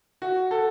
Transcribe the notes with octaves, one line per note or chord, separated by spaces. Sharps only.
F#4
A4